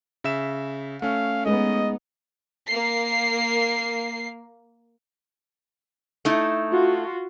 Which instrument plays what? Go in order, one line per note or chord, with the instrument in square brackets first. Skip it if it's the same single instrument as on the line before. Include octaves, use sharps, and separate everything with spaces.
[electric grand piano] C#3 E5 E7
[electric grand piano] A3 C#4 [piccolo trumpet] F5
[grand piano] G#3 [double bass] B3 D#4 [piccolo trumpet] D#5
[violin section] A#3 C7
[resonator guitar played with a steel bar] A3 D#4 E4
[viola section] F4 F#4